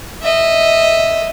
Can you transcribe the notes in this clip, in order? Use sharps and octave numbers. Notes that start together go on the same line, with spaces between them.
D#5 E5